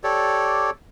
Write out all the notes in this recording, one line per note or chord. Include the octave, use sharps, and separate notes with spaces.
G4 A4 C#5 D5